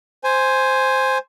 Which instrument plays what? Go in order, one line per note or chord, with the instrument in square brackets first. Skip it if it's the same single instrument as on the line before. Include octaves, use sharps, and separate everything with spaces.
[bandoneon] C5 G#5